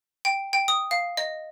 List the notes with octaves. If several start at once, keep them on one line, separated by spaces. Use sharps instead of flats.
G5
G5
D#6
F5
D#5